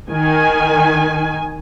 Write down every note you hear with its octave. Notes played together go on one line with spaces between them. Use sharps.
D#3 G#5